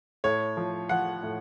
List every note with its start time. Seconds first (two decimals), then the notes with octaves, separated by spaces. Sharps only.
0.24 A2 C#5
0.57 F3
0.89 F3 F#5
1.23 A2